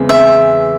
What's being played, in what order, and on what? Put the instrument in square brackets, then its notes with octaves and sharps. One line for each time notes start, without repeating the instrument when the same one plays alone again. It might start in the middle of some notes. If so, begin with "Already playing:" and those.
Already playing: [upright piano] E2 C#3 E3 G#3 C4
[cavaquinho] E5